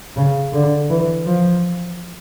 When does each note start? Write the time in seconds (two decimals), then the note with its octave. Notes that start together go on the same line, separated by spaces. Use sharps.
0.17 C#3
0.53 D3
0.90 E3
1.27 F3